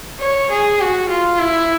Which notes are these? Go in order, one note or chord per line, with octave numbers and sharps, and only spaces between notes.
C#5
G#4
F#4
F4
E4